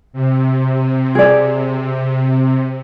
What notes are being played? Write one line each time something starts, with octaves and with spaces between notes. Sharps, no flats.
C3
G#4 D5